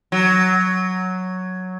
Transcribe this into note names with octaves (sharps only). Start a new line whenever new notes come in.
F#3